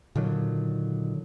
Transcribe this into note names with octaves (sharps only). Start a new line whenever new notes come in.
A#2 D3 D#3 F#3